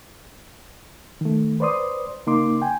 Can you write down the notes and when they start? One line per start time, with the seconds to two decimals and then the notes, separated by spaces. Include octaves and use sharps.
1.21 D#3 A3
1.60 B4 C5 D5 C6 D#6
2.27 C#3 A#3 D#4 C6 D6
2.62 G5 G#5